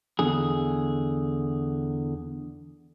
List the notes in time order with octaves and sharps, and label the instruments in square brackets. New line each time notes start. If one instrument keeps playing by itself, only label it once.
[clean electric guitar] E2 D3 G#4